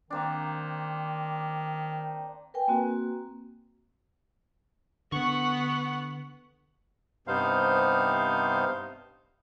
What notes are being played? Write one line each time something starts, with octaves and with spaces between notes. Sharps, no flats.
D#3 A#3 C4 D4
A#4 B4 G5 G#5
A#3 C4 F#4
D3 B3 F#5 C#6
G2 C3 B3 D#4 C5 F5